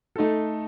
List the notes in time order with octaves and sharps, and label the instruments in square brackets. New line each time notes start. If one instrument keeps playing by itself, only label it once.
[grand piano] A3 D#4 A4